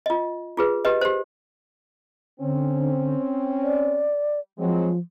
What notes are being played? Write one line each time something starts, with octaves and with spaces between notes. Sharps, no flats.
F4 D#5
F4 G#4 B4
G4 B4 D#5
G4 C5
D3 C4 C#4
D5
F3 F#3 G#3 C4